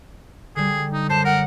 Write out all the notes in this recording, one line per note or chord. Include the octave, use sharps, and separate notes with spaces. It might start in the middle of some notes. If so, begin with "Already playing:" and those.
D3 G3 G#4
D#4
F#2 C5 A5
A#4 F#5